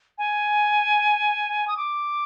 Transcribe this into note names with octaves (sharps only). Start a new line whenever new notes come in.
G#5
D#6
D6